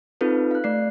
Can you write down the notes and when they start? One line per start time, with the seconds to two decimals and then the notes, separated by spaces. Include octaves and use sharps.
0.21 C4 D#4 F4 A4 B4
0.51 F5 F#6
0.64 A3 D5 C7